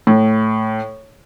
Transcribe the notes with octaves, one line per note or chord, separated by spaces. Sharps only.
A2